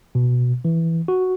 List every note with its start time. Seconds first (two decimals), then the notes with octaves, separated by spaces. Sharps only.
0.15 B2
0.65 E3
1.08 F#4